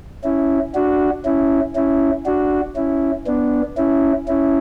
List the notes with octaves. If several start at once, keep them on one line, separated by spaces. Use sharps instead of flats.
C#4 E4
D4 F#4
C#4 E4
C#4 E4
D4 F#4
C#4 E4
B3 D4
C#4 E4
C#4 E4